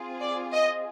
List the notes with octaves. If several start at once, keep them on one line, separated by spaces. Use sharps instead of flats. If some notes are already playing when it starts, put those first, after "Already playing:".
Already playing: C4 F4 G#4
D5
D#5